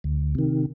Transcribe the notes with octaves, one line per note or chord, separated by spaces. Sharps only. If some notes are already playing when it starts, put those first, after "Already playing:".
D2
C3 D#3